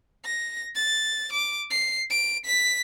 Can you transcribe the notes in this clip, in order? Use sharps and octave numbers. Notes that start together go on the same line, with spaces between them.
A#6
A6
D6
C7
D7
B6